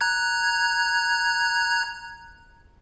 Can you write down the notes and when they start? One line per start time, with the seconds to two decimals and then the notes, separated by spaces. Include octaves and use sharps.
0.01 A#5 F#6 G#6